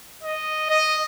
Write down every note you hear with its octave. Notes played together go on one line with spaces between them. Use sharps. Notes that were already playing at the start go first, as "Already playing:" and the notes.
D#5
D#5